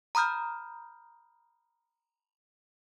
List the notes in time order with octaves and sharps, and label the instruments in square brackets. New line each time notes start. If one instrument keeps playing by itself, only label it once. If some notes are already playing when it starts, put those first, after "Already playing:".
[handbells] A#5 B5 D#6 F6 G6